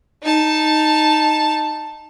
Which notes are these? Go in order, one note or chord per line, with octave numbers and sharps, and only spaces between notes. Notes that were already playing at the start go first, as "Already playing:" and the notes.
D#4 A5